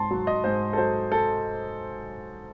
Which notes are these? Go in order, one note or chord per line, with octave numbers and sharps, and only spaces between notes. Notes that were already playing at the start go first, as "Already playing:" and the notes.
Already playing: G#2 A5 C6
F#3
D#5
G#2 C5
A4
F#3 C5
A4